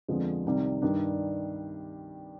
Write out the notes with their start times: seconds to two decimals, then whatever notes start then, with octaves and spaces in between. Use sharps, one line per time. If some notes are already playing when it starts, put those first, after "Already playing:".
0.08 F2 D3 F3 G#3 B3
0.45 C2 C3 D#3 G3
0.82 G2 D#3 G3 D4